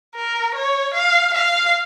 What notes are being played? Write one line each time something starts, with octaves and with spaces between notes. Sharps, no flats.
A#4
C#5
F5
F5